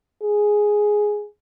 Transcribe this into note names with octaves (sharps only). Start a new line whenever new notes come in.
G#4